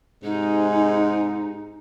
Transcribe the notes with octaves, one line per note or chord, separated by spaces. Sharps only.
G#2 C3 G#3 D#4